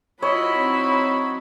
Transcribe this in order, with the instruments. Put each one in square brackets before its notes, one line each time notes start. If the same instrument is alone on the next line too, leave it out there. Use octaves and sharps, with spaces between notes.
[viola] F#3 B5 [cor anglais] E4 [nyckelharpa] F4 D#5 [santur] C#5
[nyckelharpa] C4 D#4